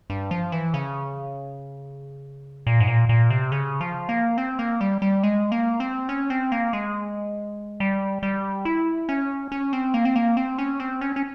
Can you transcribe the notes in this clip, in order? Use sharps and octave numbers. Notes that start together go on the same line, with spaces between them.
G2
F3
E3
C#3
A#2
G#2
A#2
A#2
C3
C#3
F3
A#3
C4
A#3
G3
G3
G#3
A#3
C4
C#4
C4
A#3
G#3
G3
G3
E4
C#4
C#4
C4
A#3
C4
A#3
C4
C#4
C4
C#4
C#4